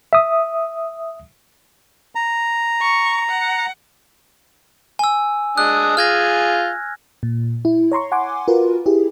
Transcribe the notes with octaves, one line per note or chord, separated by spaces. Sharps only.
E5 D#6
A#5
C#6
F#5
G#5 E6
G#3 D4 D#6 F#6
F4 G#4 F6 G#6 A#6
A#2
E4
C#5 A#5 C6 C#6
F#5 G#5 C6 D6
F4 F#4 A#4 B4
E4 G4 G#4